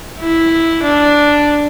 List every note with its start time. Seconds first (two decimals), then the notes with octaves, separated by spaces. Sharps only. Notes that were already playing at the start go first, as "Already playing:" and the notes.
0.20 E4
0.83 D4